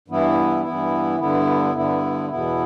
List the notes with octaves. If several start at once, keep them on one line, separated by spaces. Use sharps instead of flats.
G2 E3 B3 E4
G2 E3 B3 E4
G2 D3 B3 E4
G2 D3 B3 E4
E2 B2 B3 E4